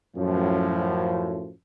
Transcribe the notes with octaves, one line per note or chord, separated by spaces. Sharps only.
F#2 A2 F3